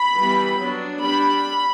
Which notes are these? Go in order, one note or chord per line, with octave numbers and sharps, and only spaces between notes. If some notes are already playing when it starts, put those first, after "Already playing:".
Already playing: B5
E3 G3 B3
F#3 B3 D4
G3 D4 B5